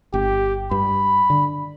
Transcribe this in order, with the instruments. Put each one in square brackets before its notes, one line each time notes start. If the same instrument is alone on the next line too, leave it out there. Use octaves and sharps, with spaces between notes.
[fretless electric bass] G1 [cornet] G4
[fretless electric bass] G2 [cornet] B5
[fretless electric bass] D3